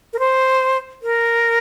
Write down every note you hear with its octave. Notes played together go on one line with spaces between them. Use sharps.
A#4
C5
A#4